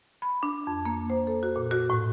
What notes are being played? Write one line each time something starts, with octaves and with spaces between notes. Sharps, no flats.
B5
D4
F2
A#3
C5
A4
F#4
A#2
F#4
A2